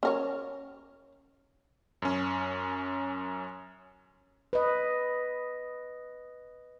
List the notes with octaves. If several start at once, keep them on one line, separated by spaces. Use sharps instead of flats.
C#4 A#4 C#5
F#2 C#4
B4 D#5